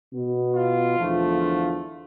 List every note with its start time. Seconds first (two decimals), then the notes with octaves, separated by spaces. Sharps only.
0.12 B2 B3
0.55 F4
0.98 E2 D3 F3 A3
1.40 F4